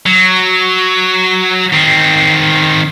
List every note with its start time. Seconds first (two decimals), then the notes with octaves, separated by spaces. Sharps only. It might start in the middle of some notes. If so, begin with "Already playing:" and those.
0.06 F#3
1.72 D#3 C4